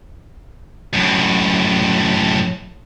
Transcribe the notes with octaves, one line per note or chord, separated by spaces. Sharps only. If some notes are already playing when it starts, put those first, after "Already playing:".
F#2 A2